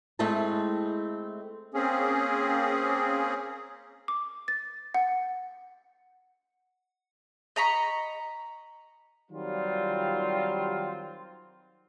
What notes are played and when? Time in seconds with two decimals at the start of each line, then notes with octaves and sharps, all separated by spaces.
0.19 G#3 A3 C4 E4 A5
1.74 A#3 C4 C#4 G#4
4.08 D6
4.48 A6
4.94 F#5
7.56 D#5 A#5 B5 C#6
9.31 D#3 F#3 G3 C4 F4